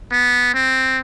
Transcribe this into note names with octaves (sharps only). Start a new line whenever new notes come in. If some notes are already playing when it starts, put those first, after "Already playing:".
B3
C4